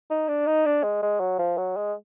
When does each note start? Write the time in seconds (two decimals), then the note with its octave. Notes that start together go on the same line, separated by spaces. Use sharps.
0.10 D#4
0.28 D4
0.47 D#4
0.66 D4
0.83 G#3
1.03 G#3
1.20 F#3
1.39 F3
1.57 F#3
1.76 G#3